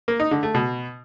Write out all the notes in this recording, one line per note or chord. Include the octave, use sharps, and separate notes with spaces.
A#3
D#4
D3
A3
B2